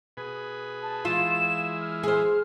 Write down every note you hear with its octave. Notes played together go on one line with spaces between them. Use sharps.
B2 G#4 B4
A5
E3 G#3 E4 F4 E7
F6
G#4 C5